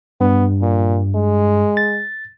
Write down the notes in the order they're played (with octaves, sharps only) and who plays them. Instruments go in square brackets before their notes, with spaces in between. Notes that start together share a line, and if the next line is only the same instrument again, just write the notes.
[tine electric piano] G2 [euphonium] B3
[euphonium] A#2
G#3
[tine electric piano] A6